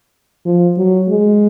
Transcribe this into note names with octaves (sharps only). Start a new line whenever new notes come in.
F3
F#3
G#3